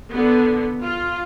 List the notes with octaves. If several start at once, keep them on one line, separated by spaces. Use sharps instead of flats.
D3 B3
F4